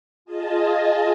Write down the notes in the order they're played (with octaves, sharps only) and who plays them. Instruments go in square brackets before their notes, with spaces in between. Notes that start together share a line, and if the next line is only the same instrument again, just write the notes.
[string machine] F4 G#4 D#5 A5